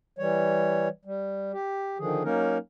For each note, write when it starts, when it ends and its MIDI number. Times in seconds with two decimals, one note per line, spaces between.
0.19 0.89 52
0.19 0.89 55
0.19 0.89 73
1.05 1.52 55
1.53 1.98 67
1.99 2.23 50
1.99 2.23 51
1.99 2.23 53
1.99 2.23 68
2.24 2.58 54
2.24 2.58 58
2.24 2.58 61
2.24 2.58 63
2.24 2.58 70